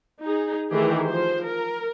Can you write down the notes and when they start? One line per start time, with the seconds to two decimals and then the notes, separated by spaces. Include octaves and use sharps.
0.21 D#4 G#4
0.70 D#3 E3 A3 G4 G#4
1.07 F3 C5
1.45 A#4